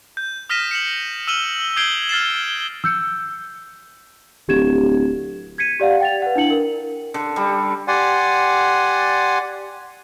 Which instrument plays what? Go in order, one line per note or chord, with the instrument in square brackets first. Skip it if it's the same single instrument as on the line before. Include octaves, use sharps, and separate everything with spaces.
[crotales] G6
D#6 F6 A#6 B6 D#7 E7
C#7 E7 F#7
E6 F6 D#7 E7 F#7 G7
D#6 G6 G#6 C7 D7 G7
F6 A6 C7 E7
[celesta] E6 G6 C#7
[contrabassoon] D1 [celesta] G4 G#6 E7
[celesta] G#6 B6 C#7 D#7
G4 D5 F5 F#5
G5 A6 F7
B4 F#5
D4 E4 C#7 F#7
A#4
[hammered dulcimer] D3
G3
[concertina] G4 D5 F#5 G#5 C6